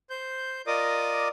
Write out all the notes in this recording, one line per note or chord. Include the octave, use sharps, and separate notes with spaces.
C5 G6
F4 A#4 D5 D#5 D6 D#6